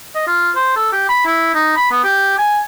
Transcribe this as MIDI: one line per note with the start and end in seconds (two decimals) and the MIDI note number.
0.15 0.26 75
0.27 0.50 65
0.55 0.72 72
0.76 0.90 69
0.92 1.07 67
1.09 1.23 83
1.26 1.53 64
1.54 1.72 63
1.76 1.90 83
1.92 2.02 59
2.04 2.36 67
2.38 2.60 80